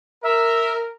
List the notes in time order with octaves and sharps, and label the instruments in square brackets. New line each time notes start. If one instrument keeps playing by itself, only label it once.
[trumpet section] A#4 [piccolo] E5